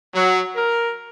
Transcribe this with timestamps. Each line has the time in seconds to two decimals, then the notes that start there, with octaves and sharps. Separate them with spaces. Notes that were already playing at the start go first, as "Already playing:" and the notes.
0.15 F#3
0.55 A#4